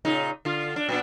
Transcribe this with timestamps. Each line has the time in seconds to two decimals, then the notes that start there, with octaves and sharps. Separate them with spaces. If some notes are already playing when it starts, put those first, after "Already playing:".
0.05 A#2 C#3 D#4
0.45 D3 F4
0.76 D4
0.89 A#2 B3 D4